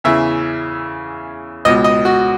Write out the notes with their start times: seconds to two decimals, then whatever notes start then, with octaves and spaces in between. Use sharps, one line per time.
0.04 E2 C#3 E3 E5
1.65 C#2 D#5
1.68 B2
1.84 D#5
2.05 F#4